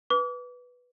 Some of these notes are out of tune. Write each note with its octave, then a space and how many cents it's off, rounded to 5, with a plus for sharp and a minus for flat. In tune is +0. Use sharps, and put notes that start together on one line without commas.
B4 +0 D6 -35